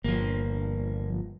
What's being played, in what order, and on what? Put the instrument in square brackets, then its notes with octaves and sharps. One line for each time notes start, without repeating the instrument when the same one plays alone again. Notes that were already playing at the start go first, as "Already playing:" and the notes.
[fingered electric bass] G1 [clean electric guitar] F3 A#3